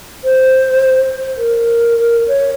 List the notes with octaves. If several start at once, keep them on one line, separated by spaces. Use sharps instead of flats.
C5
A#4
C#5